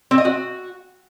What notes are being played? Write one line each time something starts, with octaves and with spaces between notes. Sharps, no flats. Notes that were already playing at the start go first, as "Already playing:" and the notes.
C4
D#5
F#4